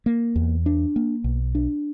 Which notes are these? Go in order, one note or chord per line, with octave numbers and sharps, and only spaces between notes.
A#3
E2
D4
A#3
B1
D4